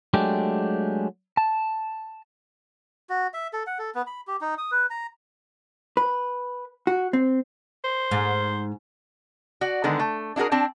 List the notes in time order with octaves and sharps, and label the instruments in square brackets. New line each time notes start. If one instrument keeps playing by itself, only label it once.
[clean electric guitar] F#3 G#3 A3 D4 G4
A5
[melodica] F#4
E5
A4
F#5
A4
B3
B5
G4
D#4
D#6
B4
A#5
[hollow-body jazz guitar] B4
F#4
C4
[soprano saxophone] C5
[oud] G#2
[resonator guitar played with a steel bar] F#4 D5
D3 D#3 G#3 B3
A3
D4 E4 F#4 G#4 A#4
C4 D4 A5